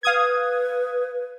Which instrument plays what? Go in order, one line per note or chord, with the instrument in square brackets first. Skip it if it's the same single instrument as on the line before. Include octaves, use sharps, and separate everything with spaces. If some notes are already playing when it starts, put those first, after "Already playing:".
[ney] B4 [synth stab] F5 D#6 G#6